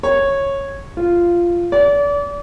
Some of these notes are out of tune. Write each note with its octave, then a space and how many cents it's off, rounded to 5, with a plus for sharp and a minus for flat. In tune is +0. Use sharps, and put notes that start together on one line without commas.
C#5 -10
F4 -10
D5 -35